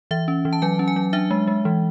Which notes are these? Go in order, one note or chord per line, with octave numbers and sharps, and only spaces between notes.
E3 E5
C#4
E3
A5
F#3 G#5
C#4
G#5
F#3
D4 E5
G#3
G#3
E3